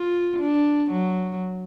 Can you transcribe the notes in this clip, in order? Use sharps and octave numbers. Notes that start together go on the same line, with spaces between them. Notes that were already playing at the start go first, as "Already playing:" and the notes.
Already playing: F4
D4
F#3